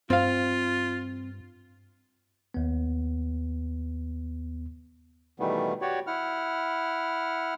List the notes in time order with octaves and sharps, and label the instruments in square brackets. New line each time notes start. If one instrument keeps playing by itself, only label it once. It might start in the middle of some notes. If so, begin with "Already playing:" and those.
[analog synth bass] G2 [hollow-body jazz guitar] C4 F5 [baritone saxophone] F4
[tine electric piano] D#2 B3
[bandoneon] B2 D#3 E3 G3 A3 B3
F#4 G4 C#5 D5
E4 F#5 F6